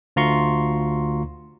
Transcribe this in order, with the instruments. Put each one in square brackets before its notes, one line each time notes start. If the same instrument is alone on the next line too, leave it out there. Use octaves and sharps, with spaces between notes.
[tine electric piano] D2 F4 A#5 C6 C#6